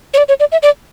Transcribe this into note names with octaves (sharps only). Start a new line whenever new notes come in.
C#5
D5
C#5
D5
E5
D5